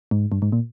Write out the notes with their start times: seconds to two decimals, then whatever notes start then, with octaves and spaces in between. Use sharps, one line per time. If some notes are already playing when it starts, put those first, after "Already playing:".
0.11 G#2
0.32 G2
0.42 G#2
0.52 A#2